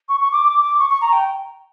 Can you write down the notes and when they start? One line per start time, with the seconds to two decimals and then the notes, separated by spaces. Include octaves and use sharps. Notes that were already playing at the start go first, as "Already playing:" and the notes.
0.09 C#6
0.20 C#6
0.32 D6
0.43 D6
0.61 D6
0.79 C#6
0.90 C#6
1.01 A#5
1.13 G5